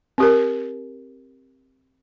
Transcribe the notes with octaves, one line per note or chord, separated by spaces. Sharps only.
C4 G4 A#4